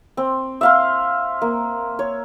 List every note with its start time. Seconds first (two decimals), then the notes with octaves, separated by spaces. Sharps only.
0.17 C4
0.61 E5 F5 C6
1.42 A#3
1.99 C#5